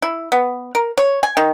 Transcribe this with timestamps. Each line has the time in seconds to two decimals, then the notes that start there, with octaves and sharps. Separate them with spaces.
0.02 E4
0.32 B3
0.75 A#4
0.98 C#5
1.23 G#5
1.37 D#3